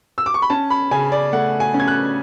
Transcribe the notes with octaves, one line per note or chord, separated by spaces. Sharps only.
E6
D6
C#6
B5
C#4 A5
B5
C#3 G#5
D5
A3 F#5
G#5
C#4
G#6
F#6